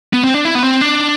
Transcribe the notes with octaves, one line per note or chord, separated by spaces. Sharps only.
B3
C4
D4
E4
B3
C4
D4